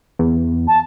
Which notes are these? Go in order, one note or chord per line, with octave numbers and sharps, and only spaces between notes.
E2
A5